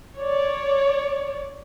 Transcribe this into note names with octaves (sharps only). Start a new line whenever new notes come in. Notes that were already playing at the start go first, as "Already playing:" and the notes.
C#5 D5